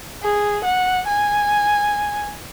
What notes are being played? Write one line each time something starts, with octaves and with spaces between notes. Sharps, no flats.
G#4
F#5
G#5